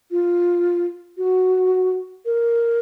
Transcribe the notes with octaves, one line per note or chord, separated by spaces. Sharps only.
F4
F#4
A#4